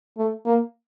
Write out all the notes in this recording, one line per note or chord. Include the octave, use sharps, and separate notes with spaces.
A3
A#3